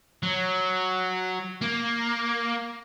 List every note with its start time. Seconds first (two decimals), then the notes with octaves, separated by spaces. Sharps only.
0.23 F#3
1.61 A#3